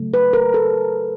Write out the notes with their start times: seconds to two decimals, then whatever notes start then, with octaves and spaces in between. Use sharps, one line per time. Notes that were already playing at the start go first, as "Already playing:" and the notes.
Already playing: C#3 F#3 A3
0.14 B4
0.33 A#4
0.54 A4